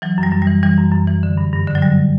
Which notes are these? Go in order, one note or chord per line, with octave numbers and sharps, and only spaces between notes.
E3 F#3
F#2
G3
F#2
E3 G3
E3 G3
F#2
F#2
E3
D3
G2
G2
D3
F#3
D3 G3